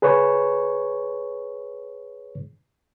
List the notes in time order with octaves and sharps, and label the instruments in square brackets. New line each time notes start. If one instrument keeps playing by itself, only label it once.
[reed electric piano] G#4 B4 C#5 C#6